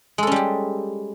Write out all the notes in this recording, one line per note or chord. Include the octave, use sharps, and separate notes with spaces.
G3 G#3 C#4 G4 A4